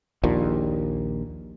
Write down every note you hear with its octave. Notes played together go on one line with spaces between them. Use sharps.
A#1 D#2 A#2